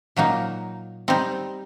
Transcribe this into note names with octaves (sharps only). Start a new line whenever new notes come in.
A#2 F#3 A#3 D#4
G3 C4 D#4